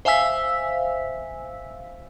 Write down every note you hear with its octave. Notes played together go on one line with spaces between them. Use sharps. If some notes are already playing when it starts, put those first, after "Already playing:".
C5 E5 F5 G#5 E6 B6